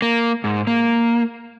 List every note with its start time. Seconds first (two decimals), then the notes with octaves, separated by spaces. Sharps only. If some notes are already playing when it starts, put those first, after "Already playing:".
0.02 A#3
0.44 G#2
0.67 A#3